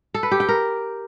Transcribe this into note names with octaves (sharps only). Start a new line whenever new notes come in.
A4
B4
G4
G5
A#4